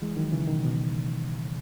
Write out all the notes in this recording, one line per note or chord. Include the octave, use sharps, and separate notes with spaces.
E3 G#3
D#3 F#3
C#3 E3
B2 D#3
B2